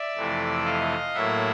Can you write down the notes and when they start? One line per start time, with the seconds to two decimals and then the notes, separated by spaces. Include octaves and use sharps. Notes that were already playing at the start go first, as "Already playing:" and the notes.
Already playing: D5 E5
0.16 F2 C3 E3 A3
0.65 D#5 F5
1.14 A2 F#3 A#3 E5 F#5